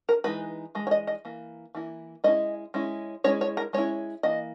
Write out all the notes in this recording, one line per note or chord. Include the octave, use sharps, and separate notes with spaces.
A#4
E3 G#3 D#4 B4
E3 G#3
C#5
D#5
D#5
E3 A#3
E3 A#3 E4
G#3 C#4 E4 D#5
G#3 C#4 E4
G#3 C#4 E4 C#5
C#5
A#4
G#3 C#4 E4 C#5
E3 A#3 D#5